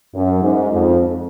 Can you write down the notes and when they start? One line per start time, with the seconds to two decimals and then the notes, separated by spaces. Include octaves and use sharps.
0.13 F#2
0.42 G#2
0.71 F2